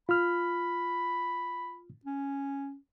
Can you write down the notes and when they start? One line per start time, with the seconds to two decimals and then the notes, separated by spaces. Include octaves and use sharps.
0.09 F4 B5 F6
2.05 C#4